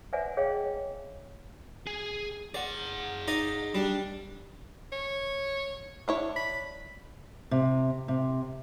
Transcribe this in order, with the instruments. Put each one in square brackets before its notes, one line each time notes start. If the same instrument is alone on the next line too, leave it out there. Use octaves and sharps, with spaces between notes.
[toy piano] B4 C5 D5 E5 F#5 G#5
G#4 C#5 D#5 F5 G5
[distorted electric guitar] G#4 G#5
[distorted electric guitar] G#4 F#5 [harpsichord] D5
[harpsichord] D#4 D5 D#5
[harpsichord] G3 [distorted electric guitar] D4
[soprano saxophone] C#5
[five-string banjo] D4 E4 C#5
[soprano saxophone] B5
[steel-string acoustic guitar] C3
C3